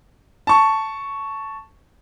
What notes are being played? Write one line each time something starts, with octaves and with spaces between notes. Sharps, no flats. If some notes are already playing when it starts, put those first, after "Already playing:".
A5 C#6